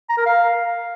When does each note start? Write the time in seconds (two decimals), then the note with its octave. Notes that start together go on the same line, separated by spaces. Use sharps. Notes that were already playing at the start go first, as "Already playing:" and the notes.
0.09 A#5
0.18 A#4
0.26 F5